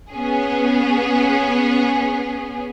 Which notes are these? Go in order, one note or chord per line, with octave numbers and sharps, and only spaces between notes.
B3 C#4 G#4